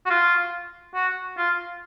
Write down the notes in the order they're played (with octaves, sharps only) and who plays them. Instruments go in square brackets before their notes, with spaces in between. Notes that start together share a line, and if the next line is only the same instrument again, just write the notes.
[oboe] F#4
F4
F#4
F4